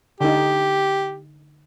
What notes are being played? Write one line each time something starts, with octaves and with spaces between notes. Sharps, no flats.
D3 D#4 G4